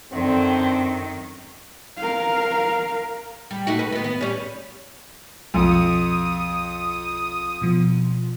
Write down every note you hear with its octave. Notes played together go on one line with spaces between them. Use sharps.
F#2 D3 D#3 C4
A#4 F5
G3
A3 D#4 F#4
B4
D#3 B3
B3
G3 C#4
B1 F2 D#6 C#7
B2 F3